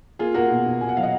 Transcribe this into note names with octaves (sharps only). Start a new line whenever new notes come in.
A#3 F4 G#4
A#3 F#4 A#4
B2
B2
B2 G#5
F#5
F#3 F5
D#5 F#5